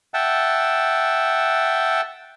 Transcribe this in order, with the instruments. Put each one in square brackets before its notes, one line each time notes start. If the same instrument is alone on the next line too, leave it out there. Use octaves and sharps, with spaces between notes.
[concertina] E5 F#5 G5 A5